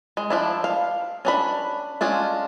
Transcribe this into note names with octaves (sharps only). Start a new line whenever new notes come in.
G#3
F3 D4 E4
F5
C#4 D4 B5
G#3 C#4 D4 F4